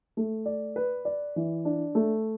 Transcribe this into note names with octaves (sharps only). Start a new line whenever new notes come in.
A3
D5
B4
D5
E3
D4
A3